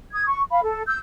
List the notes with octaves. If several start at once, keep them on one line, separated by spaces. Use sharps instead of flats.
D#6 G#6
C#6
F5 B5
A4
E6 G6